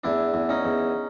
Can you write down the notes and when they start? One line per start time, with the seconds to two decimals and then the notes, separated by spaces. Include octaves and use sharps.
0.04 E2 D4 E4
0.34 E2
0.49 C#4 D#4
0.65 E2